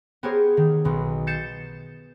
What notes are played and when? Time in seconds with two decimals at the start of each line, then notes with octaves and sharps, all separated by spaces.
0.23 B3 G4 G#4 A#4 C5 C#5
0.57 D#3
0.85 B1 B2
1.27 G6 A6 C7 C#7 E7